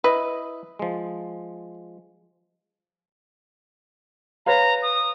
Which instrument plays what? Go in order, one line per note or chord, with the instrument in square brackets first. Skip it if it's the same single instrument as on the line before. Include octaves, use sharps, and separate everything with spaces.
[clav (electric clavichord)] E4 D#5 [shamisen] B4
[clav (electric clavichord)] F3 G#3
[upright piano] B4 C#5 F5 [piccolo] A#5
[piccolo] D#6